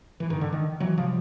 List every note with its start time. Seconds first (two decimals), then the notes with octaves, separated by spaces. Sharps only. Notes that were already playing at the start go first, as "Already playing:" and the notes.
0.20 E3
0.29 G2 D3 D#3
0.41 D3
0.53 D#3
0.80 E3 F#3
0.98 C3 F3 G3